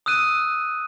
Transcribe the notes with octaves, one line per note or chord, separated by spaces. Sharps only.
D#6 E6 F#6 D#7